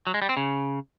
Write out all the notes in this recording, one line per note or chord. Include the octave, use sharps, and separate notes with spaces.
F#3
G#3
G3
C4
C#3